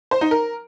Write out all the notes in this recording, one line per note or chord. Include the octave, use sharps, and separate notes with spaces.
C5
D#4
A#4